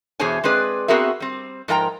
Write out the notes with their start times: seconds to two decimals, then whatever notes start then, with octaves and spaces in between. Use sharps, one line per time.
0.20 E2 B2 G#4 C5 C#5 G#5
0.44 G#3 C4 G#4 B4 D5
0.88 B3 C4 F#4 G#4 A#4 E5
1.20 G3 C4
1.68 G#2 F3 A#4 G5 A#5